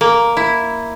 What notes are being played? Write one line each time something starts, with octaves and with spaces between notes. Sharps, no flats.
A#3
E4